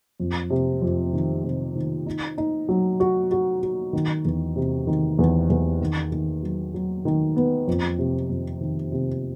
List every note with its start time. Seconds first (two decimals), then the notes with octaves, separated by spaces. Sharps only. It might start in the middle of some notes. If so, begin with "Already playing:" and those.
0.20 F2
0.50 C3
0.82 F2
1.13 D#3
1.44 C3
1.76 D#3
2.06 D#4
2.38 D#4
2.69 F#3
3.00 F#4
3.31 F#4
3.62 F#4
3.93 D#3
4.25 E2
4.56 C3
4.87 D#3
5.19 E2
5.50 E2
5.81 D#3
6.12 D#3
6.43 F#3
6.74 F#3
7.05 D#3
7.36 B3
7.67 F2
7.99 C3
8.30 F2
8.61 D#3
8.92 C3